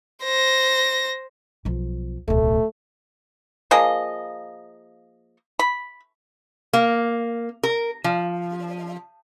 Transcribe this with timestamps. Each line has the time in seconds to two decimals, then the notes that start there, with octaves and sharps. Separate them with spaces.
0.24 C5 A#6
1.65 B1 F3
2.28 D1 B1 A3
3.71 F3 A#3 G#4 D#5
5.59 B5
6.73 A#3
7.63 A#4
8.04 F3